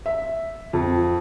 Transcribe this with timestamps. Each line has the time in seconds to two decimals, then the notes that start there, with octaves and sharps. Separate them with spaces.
0.06 E5
0.73 F2